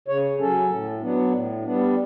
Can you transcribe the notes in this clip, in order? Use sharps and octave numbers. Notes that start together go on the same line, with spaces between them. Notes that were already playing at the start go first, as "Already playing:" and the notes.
C#3 C#5
F#3 C#4 A4
A2
F#3 B3 D4
A2
G3 B3 D4